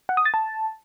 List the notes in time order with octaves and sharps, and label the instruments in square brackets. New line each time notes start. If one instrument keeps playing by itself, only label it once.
[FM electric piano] F#5
D#6
A6
A5